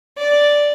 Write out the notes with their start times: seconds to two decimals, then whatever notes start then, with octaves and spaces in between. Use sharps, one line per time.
0.18 D5